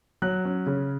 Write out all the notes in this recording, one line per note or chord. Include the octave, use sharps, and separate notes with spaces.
F#3 F#6
C#4
C#3